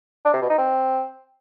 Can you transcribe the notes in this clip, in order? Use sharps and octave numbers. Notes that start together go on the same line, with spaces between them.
D4
C3
B2
D#4
C4